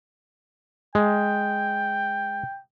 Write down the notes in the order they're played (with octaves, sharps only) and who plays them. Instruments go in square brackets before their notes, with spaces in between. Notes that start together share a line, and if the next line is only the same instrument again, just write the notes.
[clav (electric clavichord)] G#3 [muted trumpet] G5